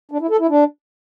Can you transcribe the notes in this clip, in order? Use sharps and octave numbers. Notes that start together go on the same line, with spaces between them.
D4
E4
A4
E4
D4